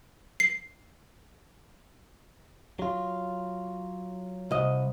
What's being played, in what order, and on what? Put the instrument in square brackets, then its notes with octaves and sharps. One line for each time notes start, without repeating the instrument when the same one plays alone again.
[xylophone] C7
[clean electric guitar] F#3 F4
[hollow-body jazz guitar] C2 D#5